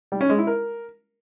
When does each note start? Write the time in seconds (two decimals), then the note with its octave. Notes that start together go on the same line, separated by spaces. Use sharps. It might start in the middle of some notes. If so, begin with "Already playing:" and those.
0.12 G3
0.21 C#4
0.29 G#3
0.38 E4
0.47 A#4